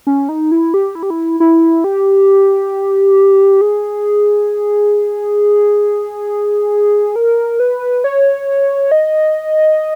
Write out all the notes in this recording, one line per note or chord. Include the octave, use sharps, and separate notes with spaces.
C#4
D#4
E4
G4
E4
G4
E4
E4
G4
G#4
A#4
B4
C#5
D#5